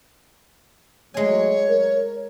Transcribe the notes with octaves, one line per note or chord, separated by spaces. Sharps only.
F#3 G#3 A3 C#5 G#5
A#4